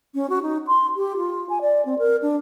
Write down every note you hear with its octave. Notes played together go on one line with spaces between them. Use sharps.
C#4
F#4
D#4
C6
G4
F4
G#5
D5
C4
A#4
D4